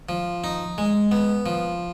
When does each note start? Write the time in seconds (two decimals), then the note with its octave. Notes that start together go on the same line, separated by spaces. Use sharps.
0.09 F3
0.44 D#4
0.78 G#3
1.11 B3
1.46 F3